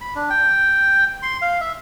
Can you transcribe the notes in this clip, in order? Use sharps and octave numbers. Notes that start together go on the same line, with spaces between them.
B5
D4
G5
C6
F5
E5